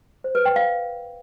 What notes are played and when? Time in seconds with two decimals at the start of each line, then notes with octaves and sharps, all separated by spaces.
0.24 C5
0.35 B4
0.45 G5
0.56 F5